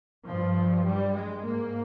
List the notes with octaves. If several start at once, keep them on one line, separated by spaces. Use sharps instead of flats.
G2 F3
G3
G#3
G#2 A#3